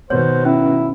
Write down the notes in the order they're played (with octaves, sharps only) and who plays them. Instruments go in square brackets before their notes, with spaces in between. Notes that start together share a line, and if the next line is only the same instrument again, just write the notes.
[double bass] B2 D#3 [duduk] C5 [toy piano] C#5
[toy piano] C#4 [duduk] E4